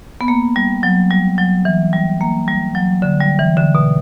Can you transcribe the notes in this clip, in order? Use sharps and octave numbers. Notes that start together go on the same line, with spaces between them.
B3
A#3
G3
F#3
G3
F#3
E3
G3
A#3
G3
F#3
D3
G3
E3
D3
B2